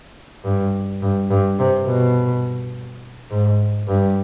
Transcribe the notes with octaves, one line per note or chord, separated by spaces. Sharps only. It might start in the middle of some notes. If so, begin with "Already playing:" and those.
G2
G2
G2
C3
B2
G#2
G2